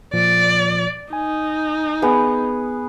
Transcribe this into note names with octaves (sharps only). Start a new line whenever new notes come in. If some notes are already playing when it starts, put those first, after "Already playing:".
A#2 F3 D5
D#4 G#5
B3 G#4